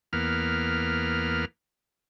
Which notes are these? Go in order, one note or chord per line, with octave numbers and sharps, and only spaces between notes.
E2 A#3 B3 F6